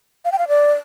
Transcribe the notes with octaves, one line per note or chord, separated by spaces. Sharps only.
F5
G5
F5
D5